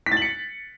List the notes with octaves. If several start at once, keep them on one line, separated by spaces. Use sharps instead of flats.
B6
A6
F#7
C#7